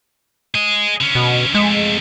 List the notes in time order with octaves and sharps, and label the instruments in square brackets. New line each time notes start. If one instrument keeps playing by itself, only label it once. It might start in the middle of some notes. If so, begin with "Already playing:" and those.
[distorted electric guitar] G#4 D#5
D3 C#4
[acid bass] B2
[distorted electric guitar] F2 A3 [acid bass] G#3